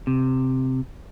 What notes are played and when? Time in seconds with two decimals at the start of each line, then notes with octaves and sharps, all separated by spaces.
0.07 C3